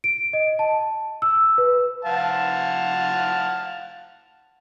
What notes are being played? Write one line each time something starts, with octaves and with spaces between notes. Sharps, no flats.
D7
D#5
A5
E6
B4
F5 F#5 A5